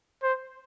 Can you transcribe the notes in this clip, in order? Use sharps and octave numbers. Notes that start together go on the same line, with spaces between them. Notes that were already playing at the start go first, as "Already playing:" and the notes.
C5